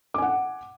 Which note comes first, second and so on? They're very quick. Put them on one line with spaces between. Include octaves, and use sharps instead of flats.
D6 G#5 F#5